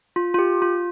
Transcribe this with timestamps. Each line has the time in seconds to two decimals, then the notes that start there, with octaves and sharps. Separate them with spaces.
0.16 F4
0.34 F4
0.38 G4
0.62 F4